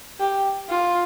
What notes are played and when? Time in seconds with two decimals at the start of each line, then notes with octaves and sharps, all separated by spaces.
0.20 G4
0.70 F4